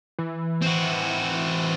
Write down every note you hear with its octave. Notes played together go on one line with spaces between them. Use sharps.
E3
C4 F#4